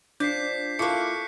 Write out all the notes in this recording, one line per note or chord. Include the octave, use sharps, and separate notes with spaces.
F3 D4 G6 B6 C7
A#3 E4 F4 A4 C#6 D6 F#6 C#7